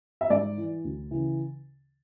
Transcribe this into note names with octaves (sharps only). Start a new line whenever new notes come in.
E5
G#2 D5
E3
D2
C#3 E3